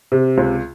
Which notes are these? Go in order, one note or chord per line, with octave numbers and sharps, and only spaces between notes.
C3
C#2